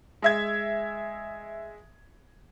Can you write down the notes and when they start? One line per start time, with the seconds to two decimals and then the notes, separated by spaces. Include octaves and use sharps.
0.22 G#3 E5 G#6